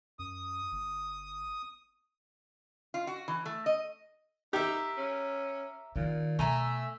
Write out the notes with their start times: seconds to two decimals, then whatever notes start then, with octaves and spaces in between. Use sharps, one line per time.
0.19 F#2 D#6
0.72 G1
2.94 F4
3.07 F#4
3.28 E3
3.46 A3
3.66 D#5
4.53 D#4 G4 A#4 E5
4.98 C#4
5.96 A#2 D#3
6.39 B2 A3 E5 G#5 A#5